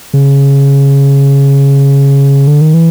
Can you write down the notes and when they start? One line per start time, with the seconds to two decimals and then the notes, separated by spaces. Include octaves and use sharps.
0.14 C#3
2.47 D3
2.61 D#3
2.74 E3